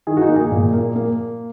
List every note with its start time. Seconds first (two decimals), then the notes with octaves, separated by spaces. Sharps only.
0.07 D#3 G#4
0.17 F#4
0.22 D#4
0.29 A#3
0.36 G#4
0.52 A#2
0.74 A#3
0.96 A#3